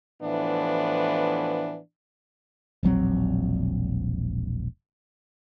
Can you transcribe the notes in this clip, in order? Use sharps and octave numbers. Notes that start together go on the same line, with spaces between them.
A2 E3 F3 B3 D4
E1 A#1 F#3 C4